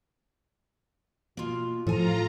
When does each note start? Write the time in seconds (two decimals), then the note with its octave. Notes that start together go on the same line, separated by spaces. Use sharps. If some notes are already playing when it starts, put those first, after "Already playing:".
1.37 B2 A#3 F4
1.87 A2 F3 F4 A4 G#5 A#5